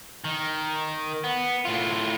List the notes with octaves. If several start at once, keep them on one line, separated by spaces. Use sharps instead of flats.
D#3
B3
A2 F4